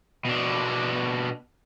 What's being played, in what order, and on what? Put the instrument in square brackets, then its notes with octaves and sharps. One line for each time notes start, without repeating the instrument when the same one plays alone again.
[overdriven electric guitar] B2 D4